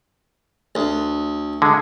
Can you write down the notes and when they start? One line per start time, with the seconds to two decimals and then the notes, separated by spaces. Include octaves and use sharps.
0.75 D2
1.62 D3 G#3